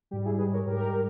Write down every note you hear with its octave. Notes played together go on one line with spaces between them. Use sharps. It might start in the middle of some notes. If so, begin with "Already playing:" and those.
G#2 G3 G4
E4 G#4
G#4 B4
A#4 C#5
G#2 G3 G4 A#4